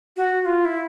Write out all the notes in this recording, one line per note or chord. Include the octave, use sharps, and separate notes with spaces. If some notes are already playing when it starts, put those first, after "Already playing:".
F#4
F#4
F4
E4